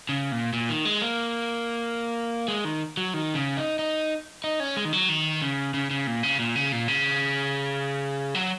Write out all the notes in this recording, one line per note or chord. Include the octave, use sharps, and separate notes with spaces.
C#3
A#2
A#2
D#3
G#3
A#3
G#3
D#3
F#3
D#3
C#3
D#4
D#4
D#4
C#4
G#3
D#3
F#3
D#3
C#3
C#3
C#3
A#2
C#3
A#2
C#3
A#2
C#3
F#3